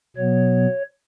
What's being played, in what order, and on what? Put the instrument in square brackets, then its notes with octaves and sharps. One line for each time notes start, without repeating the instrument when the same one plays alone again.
[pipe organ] B2 F#3 B3 C#5